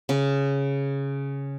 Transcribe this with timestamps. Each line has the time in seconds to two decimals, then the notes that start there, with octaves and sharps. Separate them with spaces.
0.09 C#3